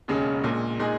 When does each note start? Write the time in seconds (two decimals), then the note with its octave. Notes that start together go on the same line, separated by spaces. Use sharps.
0.08 E1 D#2 C#3 G#3 C#4
0.43 A#1 A#2 G#3
0.79 A#2 G#3 D#4 G#4